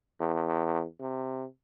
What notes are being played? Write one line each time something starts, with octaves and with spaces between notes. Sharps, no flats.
E2
C3